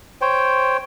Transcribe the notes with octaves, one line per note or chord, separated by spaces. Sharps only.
C5 C#5 G5